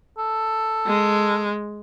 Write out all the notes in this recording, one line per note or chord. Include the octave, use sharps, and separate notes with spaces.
A4
G#3